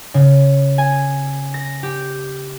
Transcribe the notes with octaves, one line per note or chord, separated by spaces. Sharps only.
C#3
G#5
A#6
G4